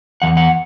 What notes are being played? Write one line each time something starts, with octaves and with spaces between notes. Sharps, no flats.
E2 E3 F#5
F#5